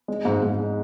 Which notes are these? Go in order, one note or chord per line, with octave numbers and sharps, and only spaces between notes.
G#3
G#2
G#2
G#3